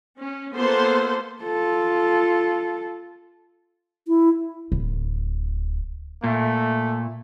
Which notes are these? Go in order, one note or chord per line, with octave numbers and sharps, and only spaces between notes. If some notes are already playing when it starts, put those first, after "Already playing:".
C#4
A#3 B3 F4 A4 C5 C6
F4 A4
E4
D1
A#2 A3